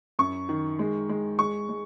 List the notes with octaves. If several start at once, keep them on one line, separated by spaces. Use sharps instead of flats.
F#2 C#6
D#3
G#3
G#3
G#3 C#6
G#3